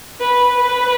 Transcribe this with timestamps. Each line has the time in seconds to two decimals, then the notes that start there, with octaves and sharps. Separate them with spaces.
0.21 B4
0.60 B4